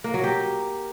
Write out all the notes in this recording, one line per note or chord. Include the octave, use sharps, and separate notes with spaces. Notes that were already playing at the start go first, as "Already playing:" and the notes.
A#3
F#3
G4